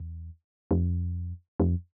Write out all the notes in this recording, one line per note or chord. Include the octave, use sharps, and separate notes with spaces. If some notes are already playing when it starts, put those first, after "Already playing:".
Already playing: E2
F2
F2